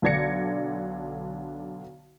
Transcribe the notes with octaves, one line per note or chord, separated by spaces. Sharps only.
B1 D3 D4 G#6 A#6 C#7